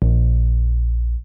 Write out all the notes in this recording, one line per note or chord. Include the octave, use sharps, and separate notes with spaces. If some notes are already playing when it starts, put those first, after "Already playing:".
A#1